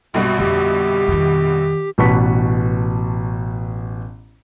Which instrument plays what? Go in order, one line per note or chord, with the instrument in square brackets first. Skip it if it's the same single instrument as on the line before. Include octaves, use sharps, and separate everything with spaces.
[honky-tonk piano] A#1 G2 B2 [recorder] F#4
[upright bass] F2 D3 [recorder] G4
[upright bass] F2 D#3
[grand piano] A1 B2 B4 A5 C#6 B6